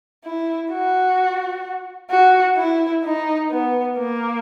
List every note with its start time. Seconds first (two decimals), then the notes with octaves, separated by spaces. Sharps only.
0.25 E4
0.71 F#4
2.11 F#4
2.57 E4
3.04 D#4
3.51 B3
3.97 A#3